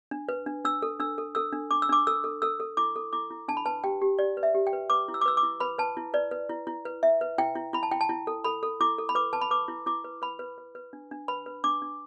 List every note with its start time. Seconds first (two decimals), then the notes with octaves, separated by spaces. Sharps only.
0.11 D4
0.29 B4
0.46 D4
0.65 D4 E6
0.82 A4
1.00 D4 E6
1.18 A4
1.35 A4 E6
1.53 D4
1.71 D4 D6
1.82 E6
1.89 D4 D6
2.07 A4 E6
2.24 A4
2.42 A4 E6
2.60 A4
2.77 E4 D6
2.96 A4
3.13 E4 D6
3.31 E4
3.48 D4 A5
3.57 B5
3.66 B4 A5
3.84 G4 G5
4.02 G4
4.19 G4 D5
4.37 B4
4.43 E5
4.55 G4
4.67 G5
4.73 B4
4.90 B4 D6
5.08 E4
5.14 E6
5.21 D6
5.26 B4 E6
5.37 D6
5.43 E4
5.60 B4 B5
5.78 B4 A5
5.97 E4
6.14 B4 D5
6.31 B4
6.50 E4
6.67 E4
6.85 B4
7.03 E4 E5
7.21 B4
7.38 E4 G5
7.55 E4
7.73 E4 B5
7.83 A5
7.91 E4 G5
8.01 A5
8.09 E4
8.27 A4
8.44 A4 B5
8.63 A4
8.81 E4 D6
8.99 A4
9.09 B5
9.15 B4 D6
9.33 B4 A5
9.41 B5
9.51 B4 D6
9.68 E4
9.86 E4 D6
10.04 B4
10.22 B4 B5
10.39 B4
10.58 B4
10.75 B4
10.93 D4
11.11 D4
11.28 B4 B5
11.46 B4
11.64 D4 D6
11.82 D4